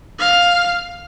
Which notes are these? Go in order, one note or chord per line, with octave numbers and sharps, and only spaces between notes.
F5